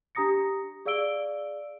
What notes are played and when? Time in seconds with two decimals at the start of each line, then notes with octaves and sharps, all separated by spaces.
0.15 D4 G4 A#5 D#6 A#6 C#7
0.86 G#4 D5 F5 E6 D7 G7